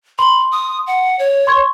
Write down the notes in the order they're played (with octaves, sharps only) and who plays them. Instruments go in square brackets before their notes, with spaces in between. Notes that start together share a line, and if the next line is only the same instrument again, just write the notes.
[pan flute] B5 [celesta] C6
[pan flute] D#6
F#5
C#5
[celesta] C6 C#6 G#6